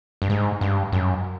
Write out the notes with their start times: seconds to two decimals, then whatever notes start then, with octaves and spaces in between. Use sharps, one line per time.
0.22 G2
0.30 G#2
0.61 G2
0.92 F#2